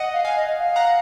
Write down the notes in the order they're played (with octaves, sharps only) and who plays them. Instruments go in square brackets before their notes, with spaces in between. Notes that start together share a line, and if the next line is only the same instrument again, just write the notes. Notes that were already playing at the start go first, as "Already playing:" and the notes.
Already playing: [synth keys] D#5 F#5
[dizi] F5
[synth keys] F5 G#5
[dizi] D#5
F5
[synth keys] F#5 A#5